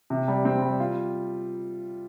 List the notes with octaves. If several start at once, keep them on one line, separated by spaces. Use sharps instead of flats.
C3
G3
C4
G3
F4